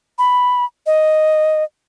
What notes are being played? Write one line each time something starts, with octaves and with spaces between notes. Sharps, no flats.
B5
D#5